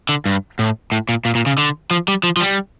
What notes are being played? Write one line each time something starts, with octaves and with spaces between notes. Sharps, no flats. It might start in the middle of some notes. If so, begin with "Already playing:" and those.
D3
G2
A2
A2
A#2
A#2
A#2
C#3
D3
F3
G3
F3
F3
G3